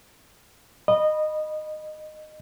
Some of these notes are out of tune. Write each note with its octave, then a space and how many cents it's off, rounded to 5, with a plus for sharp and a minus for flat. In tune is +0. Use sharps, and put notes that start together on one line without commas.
D#5 -20 B5 -15